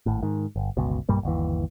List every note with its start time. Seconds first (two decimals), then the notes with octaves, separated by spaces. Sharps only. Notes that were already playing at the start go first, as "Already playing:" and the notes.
0.06 G#1 A2
0.23 G#2 D#3
0.56 G1
0.77 G1 C#2 B2
1.09 B1 G2 G3 A#3
1.23 G1 D#2 E3